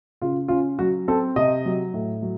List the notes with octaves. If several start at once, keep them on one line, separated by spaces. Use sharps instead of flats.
C#3 F4
C#4 F4
F#3 F#4
C4 A4
C3 D#5
F#3
A2
F#3